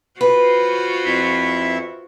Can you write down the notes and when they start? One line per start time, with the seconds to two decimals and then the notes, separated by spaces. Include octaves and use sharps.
0.21 F4 F#4 B4 C5
1.05 F2 E4 E5